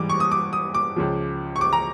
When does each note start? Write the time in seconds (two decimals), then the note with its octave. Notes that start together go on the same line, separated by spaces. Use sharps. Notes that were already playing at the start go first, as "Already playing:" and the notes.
Already playing: G#2 E3 G3 D6
0.10 C#6
0.20 D#6
0.31 D6
0.53 D#6
0.74 D6
0.96 C#2 C#3 F3
1.56 C#6
1.61 D6
1.73 A#5